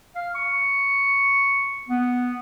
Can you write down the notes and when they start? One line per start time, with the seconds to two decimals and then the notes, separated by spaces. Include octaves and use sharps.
0.15 F5
0.35 C#6
1.88 B3